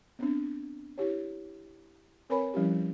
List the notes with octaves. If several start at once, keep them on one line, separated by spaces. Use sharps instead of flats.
B3 C4 D4
E4 G4 C#5
C4 A#4 B4 C#5 G#5 B5
F3 G3 C#4 E4 G4